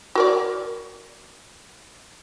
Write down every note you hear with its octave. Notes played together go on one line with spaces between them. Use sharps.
F#4 A#4 D5